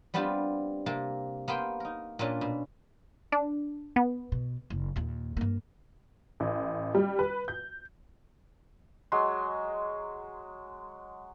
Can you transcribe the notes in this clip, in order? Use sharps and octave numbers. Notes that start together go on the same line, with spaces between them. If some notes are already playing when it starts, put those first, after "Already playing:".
G3 B3 C4 D4 F4 G4
C3 A#3 A5
A#3 B3 C5 G5
D#4 A#4
A#2 A#3 C#4 D4
B2
D4
B3
B2
F#1
D#2 A#2
G2 A#3
A1
G3
B4
G6
F#3 G#3 C6